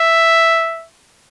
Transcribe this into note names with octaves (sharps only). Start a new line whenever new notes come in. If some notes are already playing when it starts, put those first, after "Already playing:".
Already playing: E5